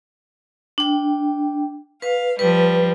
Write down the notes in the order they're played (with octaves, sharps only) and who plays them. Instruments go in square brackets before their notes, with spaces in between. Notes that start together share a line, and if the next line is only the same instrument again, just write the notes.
[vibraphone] D4 G5
[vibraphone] B4 [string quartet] F5
[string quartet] F3 G3 [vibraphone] B4